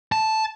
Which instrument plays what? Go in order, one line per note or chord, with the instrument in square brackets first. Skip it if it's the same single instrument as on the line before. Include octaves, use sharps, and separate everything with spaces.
[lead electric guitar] A5